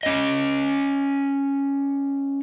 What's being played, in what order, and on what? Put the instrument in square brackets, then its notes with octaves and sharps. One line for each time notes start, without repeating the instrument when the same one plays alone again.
[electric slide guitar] C#4 D#5